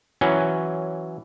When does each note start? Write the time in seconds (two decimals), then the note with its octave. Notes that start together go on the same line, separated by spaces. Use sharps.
0.21 E3 F#3 C#4